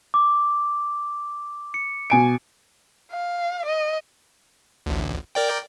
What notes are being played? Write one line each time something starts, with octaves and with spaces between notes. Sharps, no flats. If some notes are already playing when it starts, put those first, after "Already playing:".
D6
C#7
B2 G#5 D7
F5
D#5
A1 D2
A#4 D5 G5